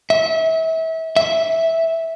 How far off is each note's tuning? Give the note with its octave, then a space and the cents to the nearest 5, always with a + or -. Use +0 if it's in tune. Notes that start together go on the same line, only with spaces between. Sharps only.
E5 -30
E5 -10